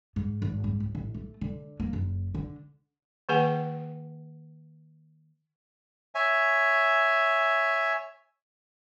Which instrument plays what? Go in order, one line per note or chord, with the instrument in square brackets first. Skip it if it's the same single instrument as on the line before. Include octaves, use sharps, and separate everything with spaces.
[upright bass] G#2
G#1
G#2
C#2
A1
A3
D3
A#3
F#1
D3
[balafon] D#3 A#3 G#4 B4 F#5 G#5
[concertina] C#5 E5 G#5